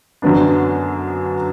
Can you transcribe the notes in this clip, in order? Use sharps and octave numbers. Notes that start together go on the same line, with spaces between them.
F#2 D3 F#3 B3 D4